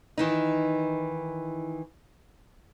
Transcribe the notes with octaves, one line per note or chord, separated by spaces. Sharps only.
D#3 E3 D#4